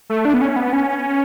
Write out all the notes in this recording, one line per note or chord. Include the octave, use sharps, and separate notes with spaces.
A3
D4
B3
C#4
B3
C#4